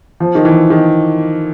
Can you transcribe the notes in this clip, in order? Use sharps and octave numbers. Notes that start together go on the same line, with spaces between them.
F3
D#3
E3
D#3